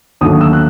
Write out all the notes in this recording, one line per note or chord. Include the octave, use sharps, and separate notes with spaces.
D#2 D3 F#3 A3 D#6
E6
F#6